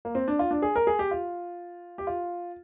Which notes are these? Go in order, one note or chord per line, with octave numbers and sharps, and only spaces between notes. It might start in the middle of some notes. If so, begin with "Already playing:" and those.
A#3
C4
D4
F4
D4
G#4
A#4
G#4
G4
F4
G4
F4